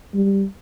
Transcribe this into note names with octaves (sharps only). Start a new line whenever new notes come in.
G3